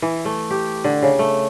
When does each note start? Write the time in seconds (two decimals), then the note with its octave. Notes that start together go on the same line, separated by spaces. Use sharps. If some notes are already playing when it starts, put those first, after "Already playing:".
0.02 E3
0.25 A3
0.50 G4
0.84 D3
1.02 C#3
1.19 A3